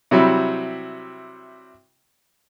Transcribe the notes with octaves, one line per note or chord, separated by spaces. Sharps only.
C3 F#3 G3 E4